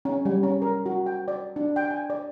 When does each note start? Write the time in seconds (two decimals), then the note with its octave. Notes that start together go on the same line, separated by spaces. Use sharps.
0.05 C#4
0.25 G3
0.43 C#4
0.62 A#4
0.86 F#4
1.06 G5
1.28 D5
1.56 D4
1.76 G5
1.91 G#5
2.10 D5